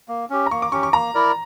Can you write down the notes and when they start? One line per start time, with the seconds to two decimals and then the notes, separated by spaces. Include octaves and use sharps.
0.08 A#3
0.30 C#4 G4
0.46 A#5
0.51 A#3 C#6
0.62 D6
0.72 C#4 G4 C#6
0.83 C#6
0.93 A#3 A#5
1.15 E4 A#4 D5